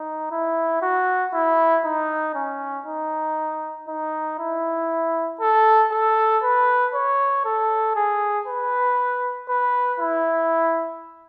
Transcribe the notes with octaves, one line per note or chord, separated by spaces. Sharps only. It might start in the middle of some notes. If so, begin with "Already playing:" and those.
Already playing: D#4
E4
F#4
E4
D#4
C#4
D#4
D#4
E4
A4
A4
B4
C#5
A4
G#4
B4
B4
E4